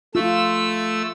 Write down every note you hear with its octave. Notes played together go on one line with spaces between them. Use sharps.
A3 F4 E6